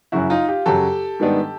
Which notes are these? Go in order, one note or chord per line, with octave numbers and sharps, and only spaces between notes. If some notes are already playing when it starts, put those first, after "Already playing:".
F#2 C#3 F#3 E4 F#4
D#4 F4
F4 G4
F#2 C#3 F#3 G4 A4
G#2 D#3 G3 B3 D4